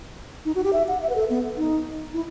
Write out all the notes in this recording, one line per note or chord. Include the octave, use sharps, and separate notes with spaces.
D#4
F#4
G4
E5
F#5
E5
B4
A4
B3
D#4
E4